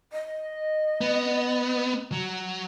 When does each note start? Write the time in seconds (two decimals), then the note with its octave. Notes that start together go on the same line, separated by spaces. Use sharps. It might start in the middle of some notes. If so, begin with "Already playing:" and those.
0.13 D#5
1.01 B3
2.12 F#3